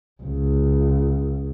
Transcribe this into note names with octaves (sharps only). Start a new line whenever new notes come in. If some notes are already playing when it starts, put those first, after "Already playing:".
C#2